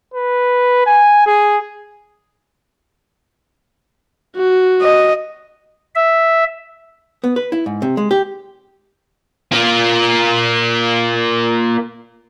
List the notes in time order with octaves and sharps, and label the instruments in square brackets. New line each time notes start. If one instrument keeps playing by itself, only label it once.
[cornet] B4
G#5
G#4
[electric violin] F#4
[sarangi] D#5
[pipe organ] E5
[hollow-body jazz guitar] B3
B4
E4
G#2
C3
G#3
G4
[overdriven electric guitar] A#3 F4